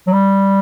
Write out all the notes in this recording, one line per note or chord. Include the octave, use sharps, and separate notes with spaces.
F#3
G3